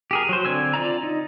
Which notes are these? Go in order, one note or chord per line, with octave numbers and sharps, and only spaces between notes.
G4 G#4 A#4
F#3 C5
D3 C4 G#5 E6
F4 D5 A#5
D#4